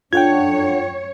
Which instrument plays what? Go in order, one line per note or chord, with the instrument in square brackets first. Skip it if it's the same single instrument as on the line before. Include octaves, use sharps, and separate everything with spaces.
[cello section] F#2 C#5 [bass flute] D4 [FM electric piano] F4 A4 F#5 [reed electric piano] G5 G#6